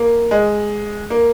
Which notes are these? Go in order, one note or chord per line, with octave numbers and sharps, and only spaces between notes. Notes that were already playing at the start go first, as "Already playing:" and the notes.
Already playing: A#3
G#3
A#3